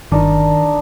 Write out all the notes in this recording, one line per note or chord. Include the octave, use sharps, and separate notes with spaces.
G1 D#3 D4 D#4